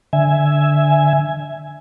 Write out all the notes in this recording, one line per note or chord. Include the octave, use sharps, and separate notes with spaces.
D3 E5 G#5